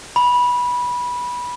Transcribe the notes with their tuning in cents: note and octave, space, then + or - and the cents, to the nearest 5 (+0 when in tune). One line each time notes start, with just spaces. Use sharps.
B5 -15